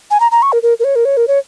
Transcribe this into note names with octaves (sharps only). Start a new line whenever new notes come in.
G#5
A#5
A#5
C#6
A#4
A#4
A#4
C#5
A#4
C#5
A#4
C#5